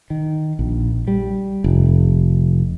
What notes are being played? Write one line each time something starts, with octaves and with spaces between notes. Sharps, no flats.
D#3
A#1
G3
F1